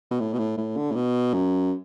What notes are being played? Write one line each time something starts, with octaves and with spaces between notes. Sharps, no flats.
B2
A2
B2
A2
A2
D3
A2
B2
F#2